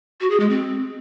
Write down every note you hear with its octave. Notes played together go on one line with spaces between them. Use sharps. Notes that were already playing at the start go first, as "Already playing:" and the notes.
F#4
G#4
G#3
C4